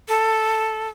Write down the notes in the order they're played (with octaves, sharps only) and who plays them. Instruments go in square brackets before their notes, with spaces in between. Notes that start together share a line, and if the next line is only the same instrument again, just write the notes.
[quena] A4